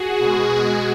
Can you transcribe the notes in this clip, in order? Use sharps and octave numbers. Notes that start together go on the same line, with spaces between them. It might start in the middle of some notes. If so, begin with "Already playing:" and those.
Already playing: F#4 G#4
B2 G#3